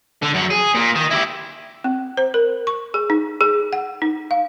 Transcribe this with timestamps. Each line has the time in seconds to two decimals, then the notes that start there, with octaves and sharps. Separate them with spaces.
0.22 D3
0.34 F#2 F#3
0.51 G#4
0.75 A#2
0.95 D#3
1.11 E4 G4
1.84 C4
2.17 C5
2.34 A#4
2.67 C#6
2.94 G#4
3.10 D#4
3.41 G#4
3.73 F#5
4.02 D#4
4.31 F5